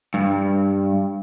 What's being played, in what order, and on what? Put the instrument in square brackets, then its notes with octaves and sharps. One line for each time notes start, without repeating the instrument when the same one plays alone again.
[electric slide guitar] G2